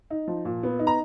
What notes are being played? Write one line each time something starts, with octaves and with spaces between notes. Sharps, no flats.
D#4
F3
A#2
B3
D#4
A#5